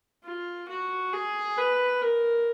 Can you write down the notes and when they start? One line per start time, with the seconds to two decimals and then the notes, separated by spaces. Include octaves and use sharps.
0.24 F4
0.68 F#4
1.13 G#4
1.57 B4
2.02 A#4